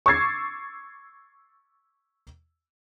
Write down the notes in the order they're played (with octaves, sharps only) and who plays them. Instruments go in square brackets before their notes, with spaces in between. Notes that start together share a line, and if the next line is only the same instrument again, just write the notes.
[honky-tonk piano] C#6 D6 E6 G#6 A6 C7